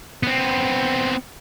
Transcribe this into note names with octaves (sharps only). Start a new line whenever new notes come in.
B3 C4